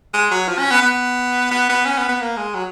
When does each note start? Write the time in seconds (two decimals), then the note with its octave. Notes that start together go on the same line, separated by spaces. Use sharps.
0.14 G#3
0.31 F#3
0.48 F3
0.59 C#4
0.71 B3
0.82 B3
1.51 B3
1.69 B3
1.85 C#4
1.98 B3
2.08 B3
2.20 A#3
2.37 G#3
2.54 F#3